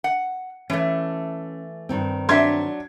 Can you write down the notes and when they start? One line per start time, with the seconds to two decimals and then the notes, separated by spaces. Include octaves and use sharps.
0.04 F#5
0.70 E3 A3 C#4
1.89 G2 D#3 C4
2.29 F#3 D4 E5 C6 G#6